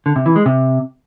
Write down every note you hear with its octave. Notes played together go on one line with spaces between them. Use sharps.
D3
C3
E3
G#3
C3